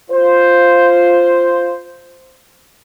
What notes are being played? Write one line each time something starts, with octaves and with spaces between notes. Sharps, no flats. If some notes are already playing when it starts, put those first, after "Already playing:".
F4 C5